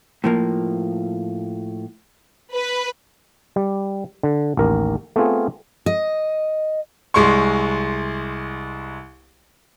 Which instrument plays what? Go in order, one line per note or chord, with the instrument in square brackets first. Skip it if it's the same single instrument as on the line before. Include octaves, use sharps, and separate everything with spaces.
[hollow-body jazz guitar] A2 F3 A#3
[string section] B4
[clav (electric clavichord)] G3
D3
A1 D#2 A#4
A3 B3 C4 F4 G#4
[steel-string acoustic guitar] D#5
[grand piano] C2 G#3 C6 C#6